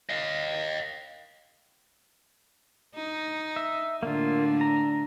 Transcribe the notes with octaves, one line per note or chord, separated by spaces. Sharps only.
D#5 F5
D#4
E5
A2 D3 A#3 F4
A#5